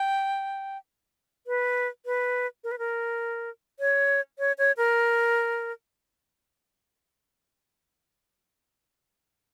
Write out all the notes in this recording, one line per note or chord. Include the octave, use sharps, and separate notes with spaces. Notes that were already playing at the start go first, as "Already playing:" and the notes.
Already playing: G5
B4
B4
A#4
B4
A#4
C#5
C#5
C#5
A#4